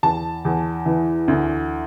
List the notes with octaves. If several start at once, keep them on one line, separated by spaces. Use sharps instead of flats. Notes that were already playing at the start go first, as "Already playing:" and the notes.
E2 A5
E2
E3
D2